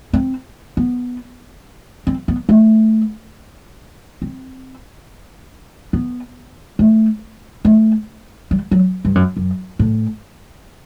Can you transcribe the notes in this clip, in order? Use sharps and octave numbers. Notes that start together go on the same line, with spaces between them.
C4
B3
C4
B3
A3
C4
B3
A3
A3
G3
F#3
G2
F#2
F#2
A2